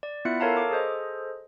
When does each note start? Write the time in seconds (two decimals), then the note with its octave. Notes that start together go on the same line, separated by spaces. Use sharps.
0.03 D5
0.25 B3 E4 F4 E5 F#6 C#7
0.40 A4 A#4 C#5 F5 A5 A#5
0.57 A4 D6
0.71 G#4 A4 C5 D#5